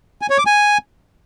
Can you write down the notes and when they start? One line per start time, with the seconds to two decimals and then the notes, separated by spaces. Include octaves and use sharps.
0.22 G#5
0.30 C#5
0.38 D6
0.46 G#5